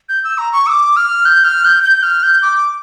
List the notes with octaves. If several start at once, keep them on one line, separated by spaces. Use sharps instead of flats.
G6
E6
A#5
C#6
E6
D6
F6
G6
F6
G6
G6
F6
G6
D6